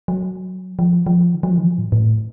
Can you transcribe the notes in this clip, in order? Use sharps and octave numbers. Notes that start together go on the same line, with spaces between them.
F#3
F3
F3
D#3
F#3
F3
D#3
F3
A2
A2